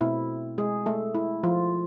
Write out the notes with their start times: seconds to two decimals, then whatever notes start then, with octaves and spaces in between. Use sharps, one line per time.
0.01 B2 A3 C4 E4
0.58 G#3 G#4
0.86 A3 A4
1.15 E4
1.43 F3 F4